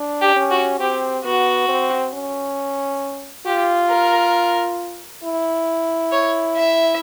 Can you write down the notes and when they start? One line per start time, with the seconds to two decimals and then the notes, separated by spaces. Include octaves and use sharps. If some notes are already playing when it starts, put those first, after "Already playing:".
Already playing: D4
0.21 G4
0.36 C#4
0.51 F#4
0.80 C4 G4
1.25 B3 F#4
1.69 C4
2.14 C#4
3.46 F4 G4
3.90 A#4
5.24 E4
6.12 C#5
6.56 E5